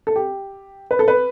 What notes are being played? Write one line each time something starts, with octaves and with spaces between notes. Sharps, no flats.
A4
G4
B4
A4
B4